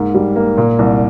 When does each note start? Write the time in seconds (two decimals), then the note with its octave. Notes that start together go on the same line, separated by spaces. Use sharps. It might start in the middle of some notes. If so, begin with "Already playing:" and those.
Already playing: G#2 A#3
0.14 G3
0.36 A#3
0.57 A#2
0.79 C2